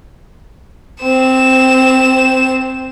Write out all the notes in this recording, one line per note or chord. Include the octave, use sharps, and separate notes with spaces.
C4 E7